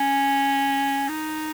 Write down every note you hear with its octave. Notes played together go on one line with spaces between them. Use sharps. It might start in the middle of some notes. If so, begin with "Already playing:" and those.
Already playing: C#4
D#4